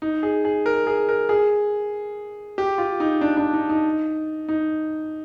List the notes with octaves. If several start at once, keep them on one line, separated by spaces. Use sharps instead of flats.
D#4
G#4
G#4
A#4
G#4
A#4
G#4
G4
F4
D#4
D4
D4
D#4
D#4
D#4